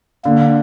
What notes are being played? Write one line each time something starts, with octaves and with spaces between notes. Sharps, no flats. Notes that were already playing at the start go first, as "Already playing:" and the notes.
D3 A#3